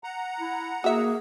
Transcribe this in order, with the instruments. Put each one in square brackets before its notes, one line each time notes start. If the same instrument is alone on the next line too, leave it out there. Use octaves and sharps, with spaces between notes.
[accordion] F#5 A#5
[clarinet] E4
[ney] A#3 [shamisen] F#4 E5 [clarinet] G#4